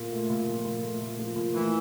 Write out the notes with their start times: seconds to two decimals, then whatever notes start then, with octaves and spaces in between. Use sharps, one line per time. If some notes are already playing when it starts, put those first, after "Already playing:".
Already playing: A#2
0.12 A3
0.29 A#2
0.48 F3
0.65 A#2
0.83 A3
1.01 A#2
1.19 F3
1.36 A#2
1.53 E3 A3